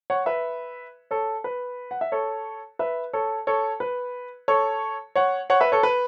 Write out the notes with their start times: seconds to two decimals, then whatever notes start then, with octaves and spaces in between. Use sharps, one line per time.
0.10 C#5 F#5
0.26 B4 E5
1.11 A4 C#5
1.44 B4
1.91 F#5
2.01 E5
2.12 A4 C#5
2.79 B4 E5
3.13 A4 C#5
3.47 A4 C#5
3.80 B4
4.48 A4 C#5
5.16 C#5 F#5
5.50 C#5 F#5
5.60 B4 E5
5.72 A4 C#5
5.83 B4